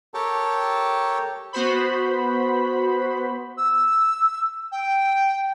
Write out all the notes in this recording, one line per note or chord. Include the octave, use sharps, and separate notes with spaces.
G4 A4 A#4 C#5 G5 A5
B3 F#4 C5 B5
E6
G5